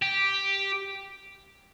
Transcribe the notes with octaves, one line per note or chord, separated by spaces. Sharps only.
G4